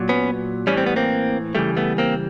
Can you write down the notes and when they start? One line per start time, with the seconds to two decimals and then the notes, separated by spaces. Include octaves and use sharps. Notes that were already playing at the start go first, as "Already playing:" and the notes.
Already playing: A#2 F#3
0.09 B3 C#4
0.67 A2 E3 G3 C#4
0.78 C4
0.86 B3
0.96 A#3 C4
1.55 C#3 E3 G3 A3
1.77 A3 B3
1.98 A#3 C4